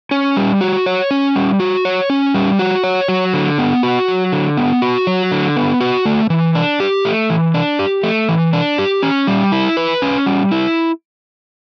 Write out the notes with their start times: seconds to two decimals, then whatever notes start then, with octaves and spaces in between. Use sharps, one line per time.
0.11 C#4
0.36 G3
0.61 F#4
0.86 C#5
1.11 C#4
1.36 G3
1.60 F#4
1.85 C#5
2.10 C#4
2.34 G3
2.59 F#4
2.84 C#5
3.08 F#3
3.34 D3
3.58 B3
3.83 F#4
4.08 F#3
4.32 D3
4.57 B3
4.82 F#4
5.07 F#3
5.32 D3
5.57 B3
5.80 F#4
6.06 A3
6.30 E3
6.55 D4
6.80 G4
7.05 A3
7.30 E3
7.54 D4
7.79 G4
8.03 A3
8.29 E3
8.53 D4
8.79 G4
9.03 C#4
9.27 G3
9.52 E4
9.77 B4
10.02 C#4
10.26 G3
10.51 E4